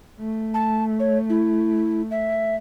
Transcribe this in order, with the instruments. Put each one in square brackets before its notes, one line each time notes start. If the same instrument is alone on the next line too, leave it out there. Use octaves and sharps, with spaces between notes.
[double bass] A3
[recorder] A5
C#5
E4
E5